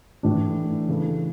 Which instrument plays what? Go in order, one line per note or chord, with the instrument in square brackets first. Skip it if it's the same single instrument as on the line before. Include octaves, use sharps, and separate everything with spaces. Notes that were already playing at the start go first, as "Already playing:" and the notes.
[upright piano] A2 E3 A3 D4
C#3 E3 A3